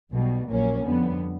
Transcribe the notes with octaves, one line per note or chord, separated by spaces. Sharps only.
B1 B2 G3
A#1 A#2 F#3 A#3 C#4
F2 D3 G3 B3